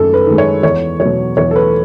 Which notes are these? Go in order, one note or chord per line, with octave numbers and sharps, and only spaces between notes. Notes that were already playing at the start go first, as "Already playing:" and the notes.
Already playing: F#2 D#3 G#3 A4
B4
D#3 G#3
C#5
E2 C#5
F#3 C#5
B2
E2 C#5
A4
B4